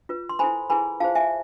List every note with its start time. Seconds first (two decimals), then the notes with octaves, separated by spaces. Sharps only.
0.09 F4 B4
0.29 C6
0.39 E4 A4 C5 G#5 B5
0.70 E4 G#4 B4 G#5 B5
1.00 F4 G#4 C5 F5 A5
1.15 E5 G#5